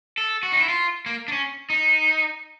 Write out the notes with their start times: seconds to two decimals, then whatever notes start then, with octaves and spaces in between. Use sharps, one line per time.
0.18 A4
0.43 F#4
0.52 D#4
0.60 E4
0.68 F4
1.06 A#3
1.28 D4
1.32 C#4
1.70 D#4